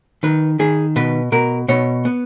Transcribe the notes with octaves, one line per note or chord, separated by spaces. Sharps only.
D#3 B4
D#3 G#4
B2 B4
B2 A#4
B2 C#5
B3